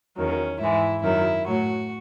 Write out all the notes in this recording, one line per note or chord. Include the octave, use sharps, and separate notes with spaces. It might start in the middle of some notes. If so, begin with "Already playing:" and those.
E2 D#3 F#3 C#4
G#2 E3 G#3 E4
F#2 D#3 F#3 E4
A2 F#3 F#4